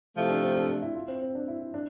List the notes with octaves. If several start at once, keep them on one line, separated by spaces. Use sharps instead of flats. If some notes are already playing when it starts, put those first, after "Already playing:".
C3 F3 A3 E4
D4
C4
D4
D4
E4
F4
C4
C4
D4
E4
E4
D4